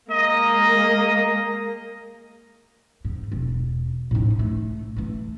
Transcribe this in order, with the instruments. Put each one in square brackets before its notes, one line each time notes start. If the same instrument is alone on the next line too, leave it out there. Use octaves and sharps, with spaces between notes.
[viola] G#3 A#3 [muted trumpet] D#5
[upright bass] G#2
E1
A2 D#4
A3
E3 A3